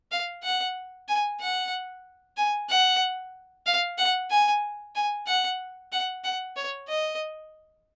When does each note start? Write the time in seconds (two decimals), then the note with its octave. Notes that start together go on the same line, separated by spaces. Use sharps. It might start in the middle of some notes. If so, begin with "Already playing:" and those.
0.11 F5
0.43 F#5
1.08 G#5
1.41 F#5
2.37 G#5
2.69 F#5
3.66 F5
3.98 F#5
4.31 G#5
4.95 G#5
5.27 F#5
5.92 F#5
6.24 F#5
6.56 C#5
6.88 D#5